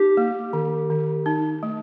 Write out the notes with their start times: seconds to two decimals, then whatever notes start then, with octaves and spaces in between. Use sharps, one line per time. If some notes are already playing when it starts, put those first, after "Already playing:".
Already playing: D#4 G4
0.17 A#3
0.53 D#3
0.90 D#3
1.26 D#4
1.63 A3